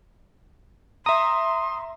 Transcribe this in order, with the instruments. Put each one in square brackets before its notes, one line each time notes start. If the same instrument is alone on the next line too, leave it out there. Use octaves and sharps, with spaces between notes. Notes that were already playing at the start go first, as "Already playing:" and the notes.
[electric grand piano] E5 A#5 [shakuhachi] C6 [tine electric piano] D#6